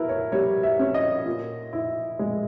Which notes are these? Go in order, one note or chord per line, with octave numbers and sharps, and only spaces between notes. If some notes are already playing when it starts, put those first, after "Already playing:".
Already playing: B2 E4 A#4 B4
C#5
G3 C#5
E5
C#4
D#5
A#2
E4
G#3